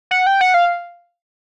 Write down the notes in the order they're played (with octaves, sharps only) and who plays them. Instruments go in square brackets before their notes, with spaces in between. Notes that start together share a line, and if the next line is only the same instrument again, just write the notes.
[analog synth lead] F#5
G5
F#5
F5